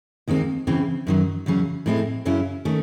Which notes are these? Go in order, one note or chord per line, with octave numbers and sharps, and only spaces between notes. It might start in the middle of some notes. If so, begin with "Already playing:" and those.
D#2 D#3 G#3 C4
E2 C#3 E3 C4
F#2 D#3 F#3
E2 C#3 F#3 C#4
A2 G#3 C4 E4
F#2 C#3 F#3 C#4 E4
D#3 A3 C#4